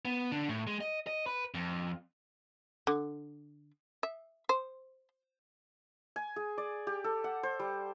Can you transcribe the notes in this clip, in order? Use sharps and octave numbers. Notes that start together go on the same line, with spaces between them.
B3
D3
A2
G#3
D#5
D#5
B4
F2
D3
E5
C5
G#5
G#4
D5
G4
A4
F#5
C5
G3